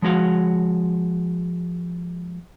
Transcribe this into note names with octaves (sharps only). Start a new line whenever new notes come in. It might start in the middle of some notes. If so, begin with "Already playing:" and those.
F3 G#3 F#4 F5